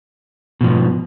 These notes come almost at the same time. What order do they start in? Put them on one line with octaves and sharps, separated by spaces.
B2 F3 G#2